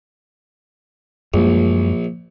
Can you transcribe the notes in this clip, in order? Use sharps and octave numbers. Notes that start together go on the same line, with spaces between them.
A#1 F#2 G3 G#3